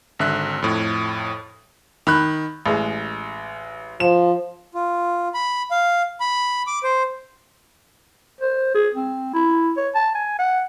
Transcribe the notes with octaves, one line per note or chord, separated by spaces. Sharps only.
G#1 D3 E5 F#6
F2 A2
D#3 B5 F#6
A1 G#3
F3 E7
F4
B5
F5
B5
D6
C5
C5
G#4
C4
E4
C#5
A5
G#5
F#5